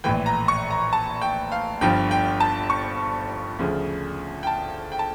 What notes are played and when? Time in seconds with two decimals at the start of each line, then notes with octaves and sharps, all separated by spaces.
0.04 A#1 A2 E3 G5
0.26 A#5
0.48 C#6
0.71 A#5
0.93 A5
1.22 G5
1.52 F5
1.81 G1 G2 F3 G5
2.11 G5
2.40 A5
2.70 C#6
3.59 D2 C#3 F3
4.43 G5
4.47 A5
4.92 G5
4.99 A5